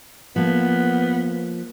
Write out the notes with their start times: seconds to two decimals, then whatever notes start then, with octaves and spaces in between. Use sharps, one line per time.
0.36 F3 A#3 B3